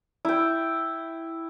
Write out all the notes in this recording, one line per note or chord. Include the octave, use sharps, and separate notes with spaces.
E4 G5